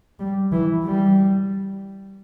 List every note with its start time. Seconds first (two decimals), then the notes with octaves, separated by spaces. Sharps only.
0.19 G3
0.52 E3
0.85 G3